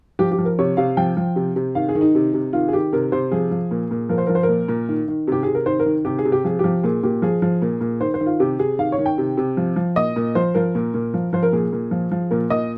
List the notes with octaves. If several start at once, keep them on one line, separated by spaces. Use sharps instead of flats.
F3 G4
G4
F3
A#4
C3 C#5
C3 F5
F3 G5
F3
C3
C3
D#3 F5
G#4
D#3
D#4
C3
C3
D#3 F4
G#4
D#3 G4
C3 A#4
C3 C5
F3 G#4
F3
A#2
A#2
F3 A#4
C5
F3 A#4
C5
A#4
A#2
A#2
D#3
D#3
C3 G4
C3 G#4
A#4
D#3 C5
A#4
D#3
C3 G4
G#4
C3
G4
F3 G#4
F3 G4
A#2 G#4
A#2 G4
F3 G#4
F3
A#2
A#2
D#3 C5
C5
D#3
F4
C3 G4
C3 G#4
D#3 F5
C#5
D#3
G5
C3
C3
F3
F3
A#2 D#5
A#2
F3 C5
F3 A#4
A#2
A#2
F3
F3 C5
A#4
A#2 G#4
A#2
F3
F3
A#2 A#4
A#2 D#5